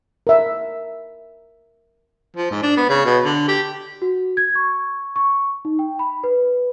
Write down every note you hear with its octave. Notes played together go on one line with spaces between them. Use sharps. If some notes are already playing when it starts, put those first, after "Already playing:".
A#4 E5
F3
G#2
D4
B3
C#3
B2
D3
G4
F#4
G#6
C#6
C#6
D#4
G5
B5
B4